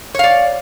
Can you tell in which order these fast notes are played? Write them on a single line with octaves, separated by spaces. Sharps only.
C#5 F5 D5